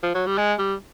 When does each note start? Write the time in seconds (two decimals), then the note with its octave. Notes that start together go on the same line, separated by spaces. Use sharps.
0.03 F3
0.15 F#3
0.27 G3
0.38 G#3
0.59 G3